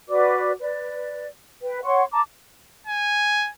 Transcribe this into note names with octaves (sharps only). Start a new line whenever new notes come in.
F#4 B4 D5 D6
B4 D5
B4 G5
C#5 F#5 C6 C#6
A5 A#5 D6
G#5